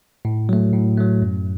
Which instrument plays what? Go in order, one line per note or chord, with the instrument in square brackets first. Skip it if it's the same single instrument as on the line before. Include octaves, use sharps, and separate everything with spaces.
[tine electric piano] A2
F#3 A3
A2
F#3 A3
F#2